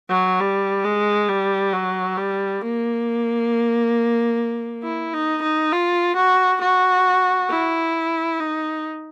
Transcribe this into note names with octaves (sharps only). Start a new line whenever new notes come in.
F#3
G3
G#3
G3
F#3
G3
A#3
E4
D#4
D#4
F4
F#4
F#4
E4
D#4